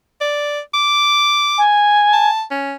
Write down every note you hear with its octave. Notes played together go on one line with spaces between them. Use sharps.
D5
D6
G#5
A5
C#4